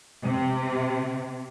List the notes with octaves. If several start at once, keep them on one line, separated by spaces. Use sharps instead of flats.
C3